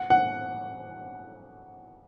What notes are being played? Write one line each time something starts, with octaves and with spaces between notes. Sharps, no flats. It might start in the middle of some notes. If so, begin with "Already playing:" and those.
Already playing: F#5
F#5